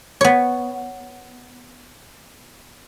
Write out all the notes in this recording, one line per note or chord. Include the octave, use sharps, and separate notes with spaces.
B3 C#5